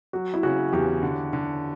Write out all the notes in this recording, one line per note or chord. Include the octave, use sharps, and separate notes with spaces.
F#3 F#4
E4
C#3 F#4
E2 G4
D3
D3